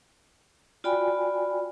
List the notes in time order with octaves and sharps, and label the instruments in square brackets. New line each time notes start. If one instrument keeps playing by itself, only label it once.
[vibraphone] F4 F#4 D5 G5 G#5 B5